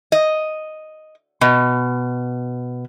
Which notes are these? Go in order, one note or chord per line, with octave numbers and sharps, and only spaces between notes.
D#5
B2